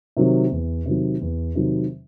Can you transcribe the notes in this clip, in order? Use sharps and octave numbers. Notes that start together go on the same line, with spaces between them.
C3 D#3 F#3
E2
C3 D#3 F#3
E2
C3 D#3 F#3